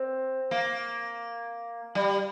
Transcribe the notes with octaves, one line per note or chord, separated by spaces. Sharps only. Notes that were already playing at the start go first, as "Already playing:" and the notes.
Already playing: C4
A#3
G3